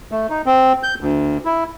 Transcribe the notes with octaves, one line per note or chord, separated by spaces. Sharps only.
A3
D#4
C4
G6
D2
E4